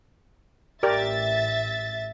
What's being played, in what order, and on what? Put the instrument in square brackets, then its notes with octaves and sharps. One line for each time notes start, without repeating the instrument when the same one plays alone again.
[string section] A1 E5 A6 [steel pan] G4 A#4 D5